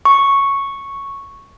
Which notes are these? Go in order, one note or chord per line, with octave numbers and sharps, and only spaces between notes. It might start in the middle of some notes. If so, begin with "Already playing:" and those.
C#6